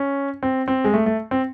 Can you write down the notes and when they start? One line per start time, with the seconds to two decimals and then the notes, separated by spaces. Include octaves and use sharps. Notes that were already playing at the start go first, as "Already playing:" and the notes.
Already playing: C#4
0.43 C4
0.68 C4
0.84 G#3
0.94 A3
1.06 A3
1.31 C4